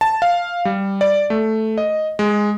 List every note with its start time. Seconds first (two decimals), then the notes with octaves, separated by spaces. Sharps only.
0.01 A5
0.22 F5
0.65 G3
1.01 D5
1.30 A3
1.78 D#5
2.19 G#3